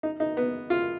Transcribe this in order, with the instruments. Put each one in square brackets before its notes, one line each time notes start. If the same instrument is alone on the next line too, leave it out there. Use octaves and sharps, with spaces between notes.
[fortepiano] D#4
D#4
B3
F4